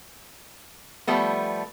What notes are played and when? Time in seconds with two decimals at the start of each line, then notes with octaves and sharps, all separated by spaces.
1.07 F3 G3 A3 B3